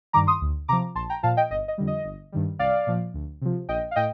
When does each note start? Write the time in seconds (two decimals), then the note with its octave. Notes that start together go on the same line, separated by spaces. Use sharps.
0.13 G2 D#3 G3 A#5 D6
0.27 C6 D#6
0.41 D2
0.68 C3 F3 A#5 D6
0.95 A#1 A5 C6
1.10 G5 A#5
1.23 A#2 F3 F5 A5
1.37 D#5 G5
1.50 G1 D#5
1.68 D#5
1.78 F2 D3 G3
1.87 D#5
2.05 G1
2.32 G2 D#3 G3
2.59 C2 D5 F5
2.87 A#2 F3
3.14 D2
3.41 C3 F3
3.68 A#1 D#5 G5
3.91 F5
3.96 A2 D#5 G5